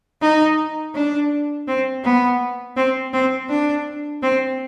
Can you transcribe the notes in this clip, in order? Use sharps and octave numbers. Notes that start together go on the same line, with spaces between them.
D#4
D4
C4
B3
C4
C4
D4
C4